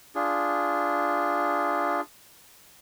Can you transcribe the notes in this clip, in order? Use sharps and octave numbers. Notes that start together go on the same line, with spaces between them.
D4 F4 G#4